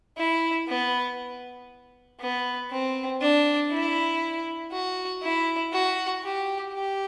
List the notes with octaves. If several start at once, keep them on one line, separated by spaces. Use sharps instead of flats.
E4
B3
B3
C4
D4
E4
F#4
E4
F#4
G4
G4